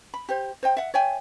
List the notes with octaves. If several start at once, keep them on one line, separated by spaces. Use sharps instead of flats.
B5
G4 C5
C5 D#5 G5
E5 F#5
C#5 E5 G5 G#5